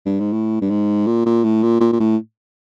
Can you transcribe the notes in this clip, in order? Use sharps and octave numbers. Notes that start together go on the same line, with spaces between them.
G2
G#2
A2
G2
G#2
A#2
A#2
A2
A#2
A#2
A#2
A2